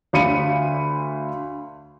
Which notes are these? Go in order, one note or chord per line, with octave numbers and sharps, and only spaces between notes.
D2 F5 B5 C#7 D#7